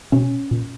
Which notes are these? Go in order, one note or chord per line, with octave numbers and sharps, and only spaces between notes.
B2 C#4
A#2